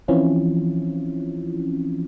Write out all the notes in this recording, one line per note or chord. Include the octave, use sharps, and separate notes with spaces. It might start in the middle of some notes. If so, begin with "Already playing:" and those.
E3 F3 C4 C#4 E4 F4